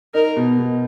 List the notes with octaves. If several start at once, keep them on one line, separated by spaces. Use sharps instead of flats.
D#4 A#4
B2
B2